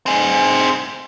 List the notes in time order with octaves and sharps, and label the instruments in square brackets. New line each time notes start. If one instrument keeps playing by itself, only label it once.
[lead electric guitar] C4 G#4